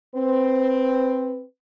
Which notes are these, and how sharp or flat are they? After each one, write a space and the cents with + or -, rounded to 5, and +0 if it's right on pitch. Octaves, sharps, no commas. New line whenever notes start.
C4 +0 B4 +15